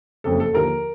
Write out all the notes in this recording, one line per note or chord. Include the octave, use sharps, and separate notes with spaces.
F#1 F2 C#3 A4
A4
D#2 D3 F3 A#4